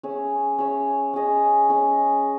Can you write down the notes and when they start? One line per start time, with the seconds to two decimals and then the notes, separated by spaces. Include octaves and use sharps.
0.03 C#4 G#4 C#5 E5
0.58 C#4 G#4 C#5 E5
1.13 C#4 G#4 D#5
1.69 C#4 G#4 D#5